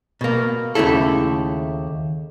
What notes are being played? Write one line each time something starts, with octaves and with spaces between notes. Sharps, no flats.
B2 A#3
D#2 C#3 A3 E4 A4